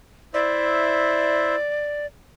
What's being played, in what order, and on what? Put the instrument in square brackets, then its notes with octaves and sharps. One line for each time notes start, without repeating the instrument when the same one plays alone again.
[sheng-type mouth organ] E4 C5 E5 [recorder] D5